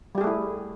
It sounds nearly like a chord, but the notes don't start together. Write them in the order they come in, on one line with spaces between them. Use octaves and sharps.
G3 G4 G#4 A3 E4